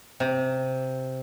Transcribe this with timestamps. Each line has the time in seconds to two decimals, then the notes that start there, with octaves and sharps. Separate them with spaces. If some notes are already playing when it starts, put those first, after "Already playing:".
0.20 C3